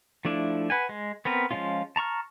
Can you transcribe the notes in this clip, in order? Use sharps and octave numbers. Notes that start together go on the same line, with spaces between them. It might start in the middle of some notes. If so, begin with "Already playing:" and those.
F3 A3 D4 E4
B4 F#5 G#5
G#3
B3 C4 A#4 B4
F3 G3 G#3 C#4 F4
A5 A#5 C#6 F6